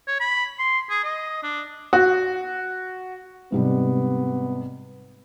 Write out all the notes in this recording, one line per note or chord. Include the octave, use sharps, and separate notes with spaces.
C#5
B5
C6
G#4
D#5
D4
F#4
G#2 C3 G3 B3